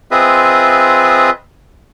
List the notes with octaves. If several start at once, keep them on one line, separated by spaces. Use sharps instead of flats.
C4 F4 G#4 B4 D#5 E5